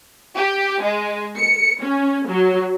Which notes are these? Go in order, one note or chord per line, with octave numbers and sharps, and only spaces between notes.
G4
G#3
C#7
C#4
F#3